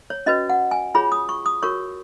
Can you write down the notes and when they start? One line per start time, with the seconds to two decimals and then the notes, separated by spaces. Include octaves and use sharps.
0.10 C#5
0.26 C#4 F#4 B4 D#5
0.50 F#5
0.71 G#5
0.95 F4 G#4 C#5 B5
1.12 D#6
1.29 C#6
1.46 D#6
1.62 F#4 A#4 C#5 C#6